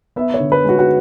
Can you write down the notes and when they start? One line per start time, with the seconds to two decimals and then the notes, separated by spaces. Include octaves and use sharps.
0.16 B3 E5
0.34 C#5
0.40 D3
0.52 B4
0.64 G#3 F#4
0.79 F#4